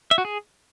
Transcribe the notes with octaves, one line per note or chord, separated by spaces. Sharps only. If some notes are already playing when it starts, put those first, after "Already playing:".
E5
F#4
G#4